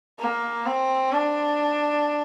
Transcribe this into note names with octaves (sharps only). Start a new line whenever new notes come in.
A#3
C4
D4